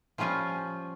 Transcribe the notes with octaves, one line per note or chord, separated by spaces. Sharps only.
F3 G3 C#4 F4 G#5